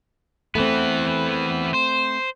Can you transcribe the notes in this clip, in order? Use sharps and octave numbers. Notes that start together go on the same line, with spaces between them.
E3 A3 B3 C4
C5